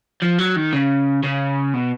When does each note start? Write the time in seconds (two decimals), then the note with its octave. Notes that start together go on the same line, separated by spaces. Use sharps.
0.22 F3
0.38 F#3
0.56 D#3
0.73 C#3
1.23 C#3
1.74 B2